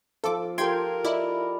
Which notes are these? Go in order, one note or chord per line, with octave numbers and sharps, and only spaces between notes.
F3 F4 A4 D6
F4 G4 A4 A#4 G5 C6 G#6
E4 D5 D#5 B5